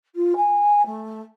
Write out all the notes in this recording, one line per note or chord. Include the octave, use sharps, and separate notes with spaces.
F4
G#5
A3